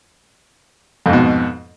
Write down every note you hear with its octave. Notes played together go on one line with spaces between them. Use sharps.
F2 G#2 B2